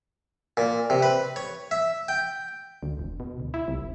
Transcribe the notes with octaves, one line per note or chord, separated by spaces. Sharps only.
A#2
C3
B4
C#5
E5
G5
D2
E1
B2
D2
E4
C2
F1